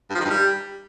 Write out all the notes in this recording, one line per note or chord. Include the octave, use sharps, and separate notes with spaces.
G2
F3
D#3
G2
G3